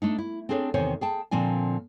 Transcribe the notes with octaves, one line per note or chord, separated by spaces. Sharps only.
A3 D4 D#4
E4
C4 D4 G#4 A4 B4 C#5
E2 C3 D#3 C5 C#5 G#5
G#4 G5 A5
A#2 D3 F3 C4 D5 G#5